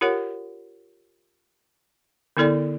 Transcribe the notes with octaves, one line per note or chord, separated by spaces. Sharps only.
F4 G4 A#4 C#5 F#5
D3 B3 E4 A4 D5